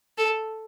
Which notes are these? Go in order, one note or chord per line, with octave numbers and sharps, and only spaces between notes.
A4